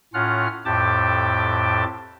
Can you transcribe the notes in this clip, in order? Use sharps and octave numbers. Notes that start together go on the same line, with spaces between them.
A2 C#4 F4 F#5 F6
F2 A2 G4 G5 A5 D6